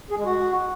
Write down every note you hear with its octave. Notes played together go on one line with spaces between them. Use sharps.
G#4
G#3
F#4